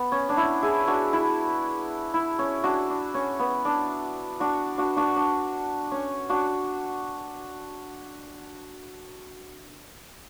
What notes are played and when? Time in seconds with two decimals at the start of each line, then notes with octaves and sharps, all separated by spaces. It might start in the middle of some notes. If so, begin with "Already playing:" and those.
Already playing: B3
0.12 C#4
0.29 D4
0.37 E4
0.62 E4 G#4
0.87 D4 F#4
1.13 E4
2.14 E4
2.39 C#4
2.64 D4 F#4
2.90 D4
3.14 C#4
3.39 B3
3.65 D4
4.40 D4 F#4
4.78 D4 F#4
4.96 D4 F#4
5.16 D4
5.91 C#4
6.29 D4 F#4